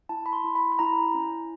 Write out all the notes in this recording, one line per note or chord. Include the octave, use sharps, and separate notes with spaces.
E4 A5
B5
C6
E4
B5
B5
E4 A#5
C#4